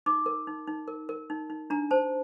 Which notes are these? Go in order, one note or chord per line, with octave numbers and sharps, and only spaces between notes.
D#4 D6
A#4
D#4
D#4
A#4
A#4
D#4
D#4
D4 A#5
C5 A5